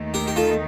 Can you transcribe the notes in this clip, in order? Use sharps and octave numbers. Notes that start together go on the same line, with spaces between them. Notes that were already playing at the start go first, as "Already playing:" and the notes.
Already playing: D#2 D#3 A3 D#4
G4 A#4
G4
F4 A4